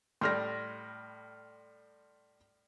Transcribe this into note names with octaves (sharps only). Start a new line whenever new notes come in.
A2 G3 C6 F6 A#6